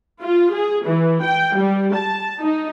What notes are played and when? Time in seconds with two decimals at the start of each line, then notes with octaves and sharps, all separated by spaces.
0.23 F4
0.55 G#4
0.87 E3
1.25 G5
1.57 G3
1.96 A5
2.40 D#4